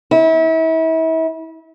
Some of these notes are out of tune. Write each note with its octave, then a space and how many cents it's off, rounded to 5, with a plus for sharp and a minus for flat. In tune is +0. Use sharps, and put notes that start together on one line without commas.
E4 -35